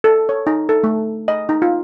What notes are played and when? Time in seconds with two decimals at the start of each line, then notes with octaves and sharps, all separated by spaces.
0.04 A4
0.29 C#5
0.47 D#4
0.69 A4
0.84 A3
1.28 D#5
1.49 D#4
1.62 F4